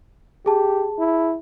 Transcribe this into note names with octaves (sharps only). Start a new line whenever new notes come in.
G4 G#4 A5
E4